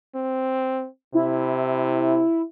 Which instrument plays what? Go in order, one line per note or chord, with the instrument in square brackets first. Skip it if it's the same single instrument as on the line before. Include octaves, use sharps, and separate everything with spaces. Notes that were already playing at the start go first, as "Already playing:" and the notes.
[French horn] C4
[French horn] C3 [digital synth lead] E4